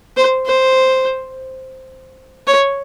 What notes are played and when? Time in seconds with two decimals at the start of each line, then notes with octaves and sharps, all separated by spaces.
0.17 C5
0.46 C5
2.47 C#5